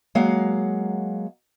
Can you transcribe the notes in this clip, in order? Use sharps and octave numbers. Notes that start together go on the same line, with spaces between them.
F#3 G#3 A#3 F5 F#5